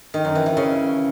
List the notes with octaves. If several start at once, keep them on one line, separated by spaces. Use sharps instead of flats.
D#3
F#2
E3
E3
C#3